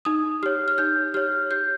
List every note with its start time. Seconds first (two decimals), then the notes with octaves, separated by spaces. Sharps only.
0.05 D#4 D#6
0.43 G4 C#5 F6
0.68 F6
0.78 D#4 G6
1.14 G4 C#5 F6
1.51 G4 G6